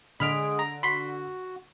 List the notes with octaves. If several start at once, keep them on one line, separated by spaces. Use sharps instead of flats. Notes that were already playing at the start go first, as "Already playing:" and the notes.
D3 G#3 G#4 B5 F6 B6 D7
A#5
F#4 B5 C6 B6